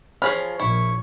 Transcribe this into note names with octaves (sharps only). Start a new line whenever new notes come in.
F3 G#4 C#5 B5 F6
A#1 E4 C#6